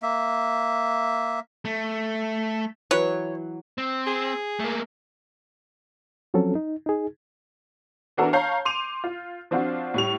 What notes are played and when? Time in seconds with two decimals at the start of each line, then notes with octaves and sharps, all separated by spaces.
0.03 A#3 E5
1.65 A3
2.91 E3 F#3 B4 C#5
3.78 C4
4.07 G#4
4.60 A3 A#3
6.34 F3 F#3 C4 C#4 A4
6.55 D#4
6.86 D#4 G#4
8.17 E3 B3 D4 F#4 A4 A#4
8.33 C#5 F5 A5 A#5 G6 C7
8.65 C6 D6 D#7 F7
9.04 F4
9.51 F3 C4 D4 F4 F#4
9.94 A2 G3 F7